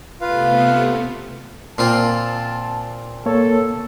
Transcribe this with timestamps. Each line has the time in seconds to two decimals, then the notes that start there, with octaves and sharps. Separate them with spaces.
0.21 C3 A3 B3 F4 B4 F5
1.78 A#2 C4 F4 A5
3.26 A#3 A4 C#5